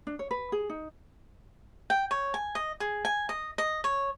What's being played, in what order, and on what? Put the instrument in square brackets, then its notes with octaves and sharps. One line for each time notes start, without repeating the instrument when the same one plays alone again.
[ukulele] D4
C#5
B4
G#4
D#4
[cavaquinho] G5
C#5
G#5
D#5
G#4
G#5
D#5
D#5
C#5